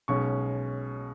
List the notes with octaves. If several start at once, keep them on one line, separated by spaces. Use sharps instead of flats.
B1 B2 G#3 C#4 C#6